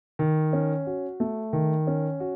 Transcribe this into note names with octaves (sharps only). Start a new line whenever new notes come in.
D#3
C#4
F#4
A3
D#3
C#4
F#4